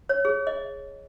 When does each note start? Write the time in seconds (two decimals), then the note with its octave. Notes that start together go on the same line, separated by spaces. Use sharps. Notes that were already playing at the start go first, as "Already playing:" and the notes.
0.09 C#5
0.25 G#4
0.47 D#5